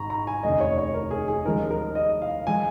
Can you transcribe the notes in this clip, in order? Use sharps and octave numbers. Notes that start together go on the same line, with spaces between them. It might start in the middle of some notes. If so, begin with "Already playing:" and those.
Already playing: G#1 G#2 A#5 C#6
A#5
G#5
F1 D#2 C#3 D#5
C#5
C#5
A#4
G#4
G#4
D#2 C#3 F3 G#3 A#4
A#4
D#5
F5
F3 G#3 G#5